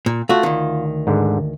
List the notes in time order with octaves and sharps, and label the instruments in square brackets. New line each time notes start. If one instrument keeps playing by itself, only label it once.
[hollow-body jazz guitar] A#2
[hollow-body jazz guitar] A3 F#4 [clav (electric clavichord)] F4
[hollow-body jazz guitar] D2 D#3
[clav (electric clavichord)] G#2 D3